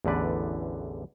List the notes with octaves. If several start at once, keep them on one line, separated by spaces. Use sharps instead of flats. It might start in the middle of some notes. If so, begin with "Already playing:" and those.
A1 E2 D3 B4 D5